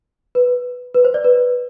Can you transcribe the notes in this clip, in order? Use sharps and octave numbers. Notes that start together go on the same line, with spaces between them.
B4
B4
C5
D5
B4